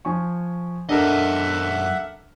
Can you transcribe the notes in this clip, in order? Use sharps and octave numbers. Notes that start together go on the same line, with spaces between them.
F3 G#5 C#6
F#2 D4 A4 A#4 D#5 E5 F#5